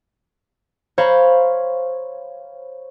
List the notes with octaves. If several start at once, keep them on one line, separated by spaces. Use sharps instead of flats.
C5 C#5 F5 A#5 B5